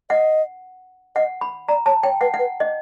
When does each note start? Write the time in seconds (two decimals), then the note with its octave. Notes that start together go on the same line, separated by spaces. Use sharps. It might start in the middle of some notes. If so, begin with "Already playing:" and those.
0.10 D#5 F#5
1.16 D#5 F#5
1.41 B5
1.69 D5 A#5
1.86 C#5 A5
2.03 C#5 G5
2.21 B4 F#5
2.34 F#5
2.39 B4
2.60 D#5